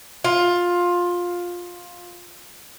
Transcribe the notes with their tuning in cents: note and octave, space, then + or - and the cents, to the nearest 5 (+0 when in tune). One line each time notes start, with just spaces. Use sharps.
F4 +15